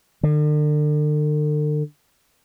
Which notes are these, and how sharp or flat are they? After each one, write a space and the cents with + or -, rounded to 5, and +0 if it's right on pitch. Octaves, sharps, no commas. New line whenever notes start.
D3 +40